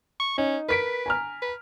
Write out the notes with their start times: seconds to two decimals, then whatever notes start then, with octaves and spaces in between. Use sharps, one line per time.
0.20 C#6
0.38 C#4 D#4
0.69 A#4 B4 B6 D7
1.06 G#5 A#5 F6
1.42 B4